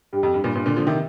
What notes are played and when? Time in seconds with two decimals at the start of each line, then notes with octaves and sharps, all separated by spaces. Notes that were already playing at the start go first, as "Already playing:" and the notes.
0.13 G2 G4
0.23 F2
0.34 G2
0.44 G2 A#2
0.55 G2 A#2
0.66 A#2 D3
0.76 D3 F3
0.87 C3 D#3